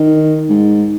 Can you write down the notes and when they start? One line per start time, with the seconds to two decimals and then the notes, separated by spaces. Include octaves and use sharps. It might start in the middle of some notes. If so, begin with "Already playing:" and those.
Already playing: D#3
0.50 G#2